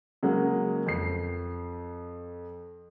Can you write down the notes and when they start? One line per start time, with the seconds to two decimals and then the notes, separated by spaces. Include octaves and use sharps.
0.23 C#3 F#3 G#3 A#3
0.86 F2 C7